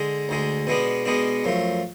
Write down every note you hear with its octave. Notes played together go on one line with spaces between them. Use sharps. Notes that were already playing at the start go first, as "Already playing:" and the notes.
Already playing: D3 G#3
D2 D3 G#3
B2 G#3 B3 D4
B2 G#3 B3 D4
F#2 F3 A3